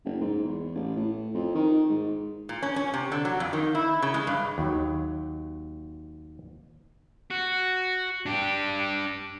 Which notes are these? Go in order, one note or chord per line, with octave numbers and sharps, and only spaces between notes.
F#1
G#2
E2
A1
A2
F2
D#3
G#2
A#2
C#4
C#4
C3
D3
F#3
F2
D#3
E4
C#3
G#3
G2
D#2 F#3
F#4
D4 G4